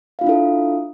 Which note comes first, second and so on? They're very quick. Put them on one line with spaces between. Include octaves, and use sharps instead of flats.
F5 F4 D4 E4 A4